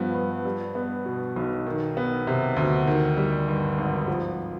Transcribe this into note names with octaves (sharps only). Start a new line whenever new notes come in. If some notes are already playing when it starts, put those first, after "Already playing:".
Already playing: G2 F3 B3
G2
G3
B3
B2
B1
D#3
B3
C3
D2
D#3
G3
G2
G#1
F3